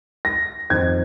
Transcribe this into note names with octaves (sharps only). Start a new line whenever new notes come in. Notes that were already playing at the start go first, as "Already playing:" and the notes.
A#6
F2 D#3 C4 D#4 G#6